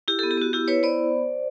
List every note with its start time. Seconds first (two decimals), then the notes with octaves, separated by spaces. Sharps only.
0.08 E4 G4
0.19 G4 A4
0.23 B3
0.31 G4
0.38 B3 F#4
0.53 E4 G4
0.68 E4 B4 C#5
0.83 B3 C5 D5